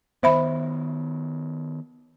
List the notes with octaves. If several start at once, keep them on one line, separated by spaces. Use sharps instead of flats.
D#3 B3 C5 E5 B5